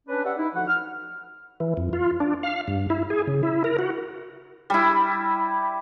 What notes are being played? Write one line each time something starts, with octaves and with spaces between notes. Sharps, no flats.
C#4 D4 B4
G4 B4 D5 E5 F#5
D#4 E4
D2 F3 F#4 F#5
F6
E3
F2
F4
D4
F5
G2
E4
G#4
C#3
E4
A#4
F#4
G3 E4